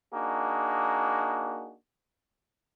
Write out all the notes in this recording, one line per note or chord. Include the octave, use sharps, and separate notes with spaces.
A#3 D4 D#4 F#4 G#4